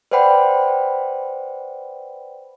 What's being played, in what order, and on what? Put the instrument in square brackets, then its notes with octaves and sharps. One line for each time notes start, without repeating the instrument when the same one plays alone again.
[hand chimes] B4 C5 D5 F#5 G5 B5